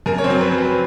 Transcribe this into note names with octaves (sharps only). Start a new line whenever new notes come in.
F#2 A#4
C#5
C4 C5
F#3
B4
F#3
B4